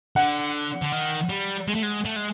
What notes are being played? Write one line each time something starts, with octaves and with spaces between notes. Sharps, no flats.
D3 F#5
D3
D#3
G3
G#3
A3
G#3
A3
G#3